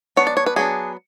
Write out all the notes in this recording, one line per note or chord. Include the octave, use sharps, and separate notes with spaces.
F#3 B3 D4 C#5
D5
C#5
B4
F#3 B3 D4 G#4